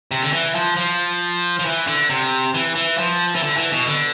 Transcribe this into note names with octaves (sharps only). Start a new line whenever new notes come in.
C3
D3
E3
F3
F3
F3
E3
D3
C3
E3
E3
F3
E3
D3
E3
B2
D3